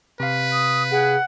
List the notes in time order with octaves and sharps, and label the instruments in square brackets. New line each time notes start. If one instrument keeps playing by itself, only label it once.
[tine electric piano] C3 F5 [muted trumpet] B4
[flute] D#6
[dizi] G#4 [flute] F#5